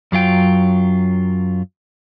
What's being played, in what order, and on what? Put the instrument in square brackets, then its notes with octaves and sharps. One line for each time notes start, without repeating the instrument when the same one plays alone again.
[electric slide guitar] F#2 F#3 F4 G5